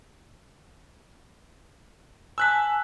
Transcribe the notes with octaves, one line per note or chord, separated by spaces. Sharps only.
G#5 A5 E6 F#6 B6